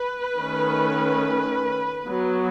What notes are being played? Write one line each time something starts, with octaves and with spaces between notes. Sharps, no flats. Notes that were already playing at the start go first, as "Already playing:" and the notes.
Already playing: B4
D#3 A3 C#4
F#3 B3